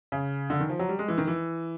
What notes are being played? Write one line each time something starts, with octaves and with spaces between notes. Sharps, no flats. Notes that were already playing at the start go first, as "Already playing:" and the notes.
C#3
D3
D#3
F3
F#3
G3
G#3
E3
D#3
E3